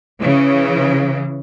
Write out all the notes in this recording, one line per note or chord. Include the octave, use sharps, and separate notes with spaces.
C#3 E3